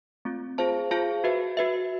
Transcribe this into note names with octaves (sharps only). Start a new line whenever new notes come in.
A3 C4 F4
F4 G#4 C5 F5 A5
F4 G#4 C5 F5 A5
F#4 B4 E5
F#4 B4 E5